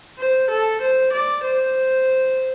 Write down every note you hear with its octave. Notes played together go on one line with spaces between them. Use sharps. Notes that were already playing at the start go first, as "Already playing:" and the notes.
C5
A4
C5
D5
C5